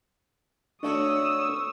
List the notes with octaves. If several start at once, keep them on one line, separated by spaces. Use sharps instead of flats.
C#3 A3 D4 F#4 C#5 C#6 D#6 E6